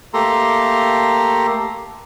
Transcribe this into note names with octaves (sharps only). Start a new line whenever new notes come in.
A3 A#3 G4 A4 A#5 C6